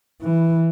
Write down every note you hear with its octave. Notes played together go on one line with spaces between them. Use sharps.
E3